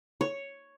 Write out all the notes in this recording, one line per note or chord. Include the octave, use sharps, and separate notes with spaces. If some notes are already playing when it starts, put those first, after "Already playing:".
C#5